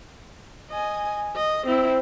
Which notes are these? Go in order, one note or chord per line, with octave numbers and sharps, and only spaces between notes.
D#5 G#5
D#5
C4 E4